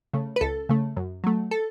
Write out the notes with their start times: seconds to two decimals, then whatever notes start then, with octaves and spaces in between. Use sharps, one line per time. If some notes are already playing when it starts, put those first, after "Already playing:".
0.13 C#3 A3
0.36 B4
0.41 C#2 A4
0.69 C#3 A3
0.97 F#2
1.24 F#3 A3
1.51 A4